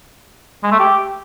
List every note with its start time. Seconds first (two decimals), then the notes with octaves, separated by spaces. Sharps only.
0.63 G#3
0.71 A3
0.80 G4